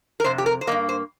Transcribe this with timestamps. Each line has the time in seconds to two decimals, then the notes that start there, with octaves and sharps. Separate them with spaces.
0.20 A#4
0.24 F2 C3 C5
0.38 G4
0.46 A#4
0.61 C5
0.67 G3 A#3 D#5
0.72 G2
0.89 C5